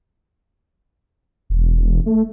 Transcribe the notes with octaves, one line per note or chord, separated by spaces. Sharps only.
E1
A3